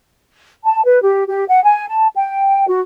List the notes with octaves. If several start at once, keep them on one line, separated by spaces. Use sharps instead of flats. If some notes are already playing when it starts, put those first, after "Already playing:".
A5
B4
G4
G4
F#5
G#5
A5
G5
F#4